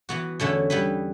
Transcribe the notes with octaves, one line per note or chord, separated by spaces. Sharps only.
E3 B3 F#4
E2 D3 A3 C#4 E4
G3 B3 E4 B4